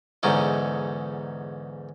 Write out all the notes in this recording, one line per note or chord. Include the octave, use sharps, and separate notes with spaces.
E2 G#2 D3 C#4 D#4